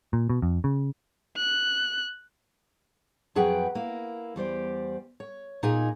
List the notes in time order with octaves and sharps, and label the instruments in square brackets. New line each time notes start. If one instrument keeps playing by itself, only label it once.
[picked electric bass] A#2
B2
F2
C#3
[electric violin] F#6
[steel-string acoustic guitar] F2 F#3 G#4 B4 F#5 G5
A#3 E4
E2 G3 C5 D5
C#5
A#2 D#4 G#4 D#5 G#5